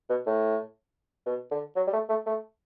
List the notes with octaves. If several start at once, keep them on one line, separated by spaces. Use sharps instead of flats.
B2
A2
B2
D3
F#3
G3
A3
A3
A3